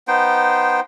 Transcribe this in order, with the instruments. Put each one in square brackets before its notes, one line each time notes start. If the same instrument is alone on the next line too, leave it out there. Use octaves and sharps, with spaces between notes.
[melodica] B3 D#4 C5 G5